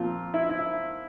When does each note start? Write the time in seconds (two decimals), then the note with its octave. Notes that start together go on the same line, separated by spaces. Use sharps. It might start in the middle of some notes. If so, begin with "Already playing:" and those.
Already playing: A#2 F3 C4 F4
0.34 E4
0.49 E4